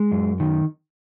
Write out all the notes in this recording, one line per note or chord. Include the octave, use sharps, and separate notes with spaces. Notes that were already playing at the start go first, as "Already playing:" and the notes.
Already playing: G#3
F#2
D#3